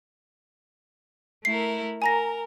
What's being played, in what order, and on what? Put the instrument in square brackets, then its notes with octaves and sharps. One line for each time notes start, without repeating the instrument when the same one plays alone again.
[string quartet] A3 E4 A#4 [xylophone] C7
[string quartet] A#4 [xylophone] G#5 A#5 A#6